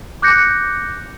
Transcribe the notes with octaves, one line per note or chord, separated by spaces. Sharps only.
D6 F#6 G6 A#6 C#7